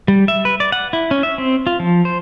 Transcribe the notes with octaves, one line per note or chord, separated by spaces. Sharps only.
G3
E5
B4
D5
F#5
E4
C#4
E5
C4
F4
F3
C5